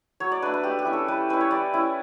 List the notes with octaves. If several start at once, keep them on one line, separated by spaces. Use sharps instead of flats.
F#3 C#5
D5
A3 D4 B4
B4
A3 G4
G4
C#4 E4
A4
G3 B4
C#4 E4 B4
C#5
G3 D5
C#4 E4